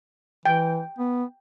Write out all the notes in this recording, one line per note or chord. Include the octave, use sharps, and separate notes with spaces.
E3 G5
B3